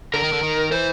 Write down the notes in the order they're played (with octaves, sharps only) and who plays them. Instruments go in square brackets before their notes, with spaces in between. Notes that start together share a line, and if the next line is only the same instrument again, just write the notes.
[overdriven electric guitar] D3 [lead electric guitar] A#4
[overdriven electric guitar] D#3
D3
D#3
[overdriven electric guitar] E3 [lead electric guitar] C5